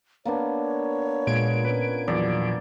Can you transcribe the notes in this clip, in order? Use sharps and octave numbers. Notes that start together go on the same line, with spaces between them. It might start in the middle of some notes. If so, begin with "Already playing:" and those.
A#3 B3 D4 C#5
A#2 G#3 G#6 D7
C#4 B4
E2 F3 F#3 D5